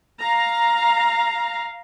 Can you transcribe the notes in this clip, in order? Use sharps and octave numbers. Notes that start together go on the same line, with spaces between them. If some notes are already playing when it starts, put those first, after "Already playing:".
F5 A#5